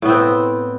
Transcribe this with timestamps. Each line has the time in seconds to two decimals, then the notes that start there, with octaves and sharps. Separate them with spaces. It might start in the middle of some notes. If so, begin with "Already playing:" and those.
0.02 A2
0.05 B3
0.08 C4